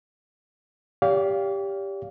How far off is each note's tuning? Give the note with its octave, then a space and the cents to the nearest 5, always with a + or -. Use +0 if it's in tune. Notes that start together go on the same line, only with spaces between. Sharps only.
G4 +10 D5 -45 F5 +0